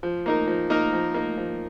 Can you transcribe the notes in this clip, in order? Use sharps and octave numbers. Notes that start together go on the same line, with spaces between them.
F3
A#3 D#4 A#4
F3
A#3 D#4 A#4
F3
A#3 D#4 A#4
F3